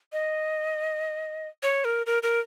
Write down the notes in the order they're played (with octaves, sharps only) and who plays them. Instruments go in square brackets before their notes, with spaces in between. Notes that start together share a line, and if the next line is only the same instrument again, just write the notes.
[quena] D#5
C#5
A#4
A#4
A#4